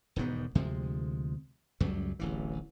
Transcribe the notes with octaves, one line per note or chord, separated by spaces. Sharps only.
E1 G#2 D#3 B3
D2 C3 F3 G#3
C#2 F#2 F#3 G3
D1 A1 E3